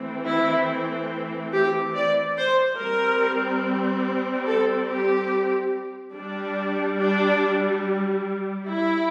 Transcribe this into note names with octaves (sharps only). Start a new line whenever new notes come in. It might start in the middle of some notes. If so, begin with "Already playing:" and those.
Already playing: E3 A3 C4
E4
G4
D5
C5
G3 C4 A#4
A4
G4
G3 D4
D4
E4